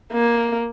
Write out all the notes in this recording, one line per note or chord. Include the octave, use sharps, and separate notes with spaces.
A#3